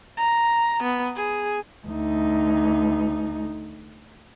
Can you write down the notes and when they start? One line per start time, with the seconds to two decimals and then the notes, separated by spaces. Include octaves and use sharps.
0.18 A#5
0.83 B3
1.16 G#4
1.87 D2 D#4